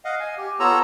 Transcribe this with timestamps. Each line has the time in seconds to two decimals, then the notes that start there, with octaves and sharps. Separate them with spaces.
0.05 D#5 F5 F#5
0.20 G#5
0.38 G4
0.60 B3 F4 A4 C#5 A#5 E6